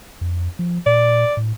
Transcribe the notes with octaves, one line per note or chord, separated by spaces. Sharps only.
F2
F3
A#2 D5
A2